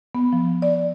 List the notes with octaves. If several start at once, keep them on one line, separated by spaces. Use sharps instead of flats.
B3
F3
D5